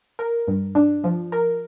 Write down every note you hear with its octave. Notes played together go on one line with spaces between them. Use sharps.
A#4
G2
D4
F3
A#4